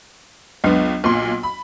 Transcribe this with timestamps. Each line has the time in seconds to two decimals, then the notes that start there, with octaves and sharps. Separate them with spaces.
0.64 C#2 F#3 B3 D4
1.04 B1 A#2 C6
1.43 B5